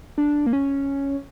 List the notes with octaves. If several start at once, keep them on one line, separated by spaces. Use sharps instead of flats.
D4
A#3
C#4